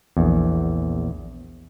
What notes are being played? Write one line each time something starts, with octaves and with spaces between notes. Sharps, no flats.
A#1 E2